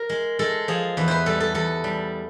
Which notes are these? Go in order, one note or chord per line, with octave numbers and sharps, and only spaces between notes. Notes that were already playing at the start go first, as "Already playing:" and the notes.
Already playing: A#4
G#3
G#3 A4
F3 G#4
E2 B4
B4 C5
G3 A4
A4
E2 A4
G3